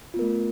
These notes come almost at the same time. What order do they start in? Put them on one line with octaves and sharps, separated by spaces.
F4 B3 A#4 A3